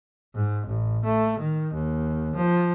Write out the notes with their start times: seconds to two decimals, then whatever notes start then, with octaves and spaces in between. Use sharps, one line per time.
0.35 G#2
0.67 A1
1.05 A3
1.40 D#3
1.74 D#2
2.35 F3